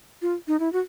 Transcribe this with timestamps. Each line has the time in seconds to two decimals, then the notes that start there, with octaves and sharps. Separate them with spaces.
0.22 F4
0.48 D#4
0.60 E4
0.73 F#4